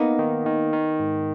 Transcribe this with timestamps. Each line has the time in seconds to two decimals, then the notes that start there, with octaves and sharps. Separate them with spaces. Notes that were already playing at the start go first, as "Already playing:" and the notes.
Already playing: A#3 B3 D#4
0.19 D#3
0.46 D#3
0.73 D#3
1.00 G#2